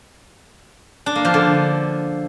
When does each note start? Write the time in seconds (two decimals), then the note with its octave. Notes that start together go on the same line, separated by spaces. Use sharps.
1.06 D4
1.15 A#3
1.25 F3
1.34 D3